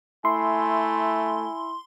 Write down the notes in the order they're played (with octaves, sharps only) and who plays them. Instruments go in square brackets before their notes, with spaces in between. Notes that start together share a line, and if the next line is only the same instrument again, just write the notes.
[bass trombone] A3 [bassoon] E4 [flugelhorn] G#5 [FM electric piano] C6